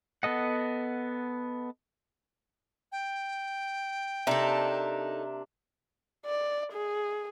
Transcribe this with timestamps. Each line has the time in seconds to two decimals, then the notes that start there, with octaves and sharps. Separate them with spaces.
0.23 B3 A4 D#5 F#5
2.92 G5
4.27 C3 A#3 D4 D#4 A4 E5 A#5
6.26 D5
6.73 G#4